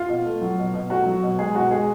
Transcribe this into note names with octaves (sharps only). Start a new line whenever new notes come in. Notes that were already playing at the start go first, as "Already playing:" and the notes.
Already playing: F4
B2
A3
F#3
B2
B2
A3 F#4
F#3
B2
G#3 G#4
B2 F#4
G#3 G#4